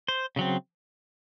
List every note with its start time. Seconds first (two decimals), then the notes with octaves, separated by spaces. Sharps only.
0.08 C5
0.36 C#3 F#3 C4